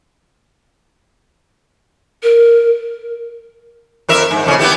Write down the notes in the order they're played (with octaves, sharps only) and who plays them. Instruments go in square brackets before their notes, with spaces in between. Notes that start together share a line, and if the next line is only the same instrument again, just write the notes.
[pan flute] A#4
[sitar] F2 A#4 E5
G#2
F2 A2 C#3
B3 E4 G4